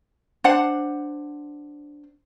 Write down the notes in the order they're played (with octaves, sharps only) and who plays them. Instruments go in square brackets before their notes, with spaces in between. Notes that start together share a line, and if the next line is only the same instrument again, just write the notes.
[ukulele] D4 C5 F#5